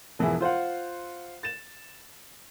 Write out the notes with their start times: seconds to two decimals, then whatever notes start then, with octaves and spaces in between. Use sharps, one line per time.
0.19 E1 E3 F3 B3 E4 G#4
0.41 F4 C5 F5 F#5
1.43 A6 E7